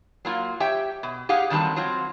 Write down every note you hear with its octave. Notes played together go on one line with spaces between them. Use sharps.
F#3 A#3 F4
G4 C#5 E5 G5
B2
G4 G#4 F5 F#5
D3 D#3 F#3 G3 C4 A5
F#3 C4 F4 C#5